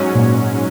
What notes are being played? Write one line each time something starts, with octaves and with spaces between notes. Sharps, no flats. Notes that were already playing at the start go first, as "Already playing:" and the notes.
Already playing: G#2 F#3 C#4
A#2